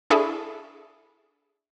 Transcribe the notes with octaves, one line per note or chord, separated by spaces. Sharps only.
D4 E4 G#4 A4 E5 C#6